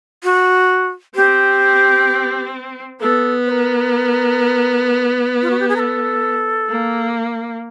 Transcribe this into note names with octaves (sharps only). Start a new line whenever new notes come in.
F#4
C4 G4
B3 A4
C5
A#4
F4
F#4
G4
G#4
A#4
A4
A#3